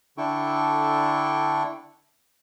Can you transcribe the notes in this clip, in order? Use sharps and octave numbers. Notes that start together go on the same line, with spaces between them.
D3 D4 E4 A4 G5 C#6